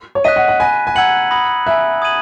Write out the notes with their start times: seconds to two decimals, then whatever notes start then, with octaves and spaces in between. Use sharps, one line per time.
0.15 C#5
0.24 D#5 F#6 B6 D#7
0.36 F#5
0.48 F#5
0.60 G#5 B5 F#6 A#6
0.87 G#5
0.95 F#5 A#5 E6 G#6 C#7 F#7
1.31 B5 D#6 A#6 C#7 F#7
1.66 E5 G#5 B5 F#6
2.02 D#6 G#6 D#7 F#7